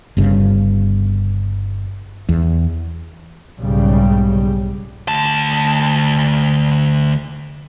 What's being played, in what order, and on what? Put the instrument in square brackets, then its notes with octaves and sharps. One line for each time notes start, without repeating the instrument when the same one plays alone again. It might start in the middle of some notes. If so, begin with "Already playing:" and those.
[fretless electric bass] G1 G2 C#3
E2
[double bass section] B1 G#2 C#3 G3
[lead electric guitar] D2 A5